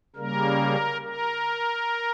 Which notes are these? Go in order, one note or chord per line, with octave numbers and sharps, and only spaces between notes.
C#3 G3 A#3 A#4
A#4